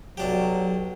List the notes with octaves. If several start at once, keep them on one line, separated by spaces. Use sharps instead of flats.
B1 F#3 D4 G4